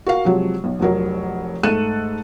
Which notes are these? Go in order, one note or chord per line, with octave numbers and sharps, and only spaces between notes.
F#4 A#4 F5
C3 F3 F#3 G#3
B1
F1 F2 F#3 A#4
G#2 A3 A4 F#6 D#7 E7